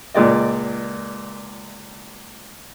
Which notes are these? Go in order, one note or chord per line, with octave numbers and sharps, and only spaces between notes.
C#2 A#2 G#3 D5 D#5